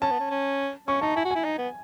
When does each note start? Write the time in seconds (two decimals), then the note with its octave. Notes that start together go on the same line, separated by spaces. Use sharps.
0.02 C#4 A5
0.11 B3
0.20 C#4
0.30 C#4
0.88 C#4 C#6
1.01 D#4 A5
1.16 E4 G#5
1.25 F#4
1.31 E4 G#5
1.45 D#4
1.58 B3